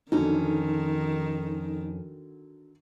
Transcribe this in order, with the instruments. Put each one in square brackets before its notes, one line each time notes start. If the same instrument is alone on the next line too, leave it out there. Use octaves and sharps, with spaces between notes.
[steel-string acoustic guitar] F2 C#4 [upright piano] D3 F#3 [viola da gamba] D#3 [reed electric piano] D#4